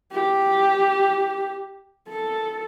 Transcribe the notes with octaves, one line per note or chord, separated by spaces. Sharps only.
G4
A4